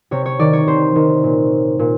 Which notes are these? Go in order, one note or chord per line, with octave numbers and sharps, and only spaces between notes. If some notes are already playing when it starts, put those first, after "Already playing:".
C3 C#5
C#5
D#3 D5
C#5
C3 C5
D#3
A#2
A#2